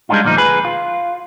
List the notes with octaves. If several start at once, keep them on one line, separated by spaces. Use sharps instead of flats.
G3 G#3 C4 D4 D#4 F4
D2 A#2 F3 D#4
G#4 B4
F4